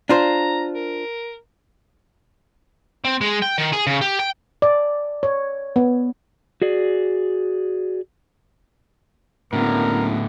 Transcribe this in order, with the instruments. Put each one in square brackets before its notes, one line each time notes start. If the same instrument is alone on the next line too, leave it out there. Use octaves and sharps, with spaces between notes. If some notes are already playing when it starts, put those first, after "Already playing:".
[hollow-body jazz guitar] D4 F4 C5 [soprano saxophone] A#5
[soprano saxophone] A#4
[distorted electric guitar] C4
G#3
G5
D#3
G#4
C#3
G4
G5
[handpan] D5
C#5
B3
[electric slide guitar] F#4 G#4 D5
[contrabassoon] F#1 [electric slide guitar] A2 D3 [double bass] B3 [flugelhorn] A#4